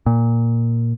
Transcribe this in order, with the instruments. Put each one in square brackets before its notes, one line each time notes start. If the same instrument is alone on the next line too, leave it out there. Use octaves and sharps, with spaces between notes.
[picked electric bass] A#2